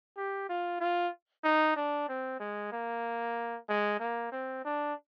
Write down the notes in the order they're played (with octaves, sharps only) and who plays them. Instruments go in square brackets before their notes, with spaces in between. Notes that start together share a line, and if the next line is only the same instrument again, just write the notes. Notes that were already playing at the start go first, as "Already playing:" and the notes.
[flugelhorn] G4
F4
F4
D#4
D4
C4
G#3
A#3
G#3
A#3
C4
D4